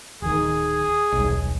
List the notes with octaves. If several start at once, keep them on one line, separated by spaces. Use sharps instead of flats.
D1 D#3 G#4
D#1 B1